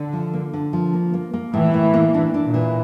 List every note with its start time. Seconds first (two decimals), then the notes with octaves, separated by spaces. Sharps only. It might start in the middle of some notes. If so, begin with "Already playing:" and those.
Already playing: D3
0.13 F3
0.33 A#3
0.54 D3
0.73 F3
0.93 A#3
1.14 A#3
1.33 A#3
1.53 A2 E3
1.74 A2
1.94 A#3
2.14 D4
2.34 D4
2.44 A#2
2.54 E3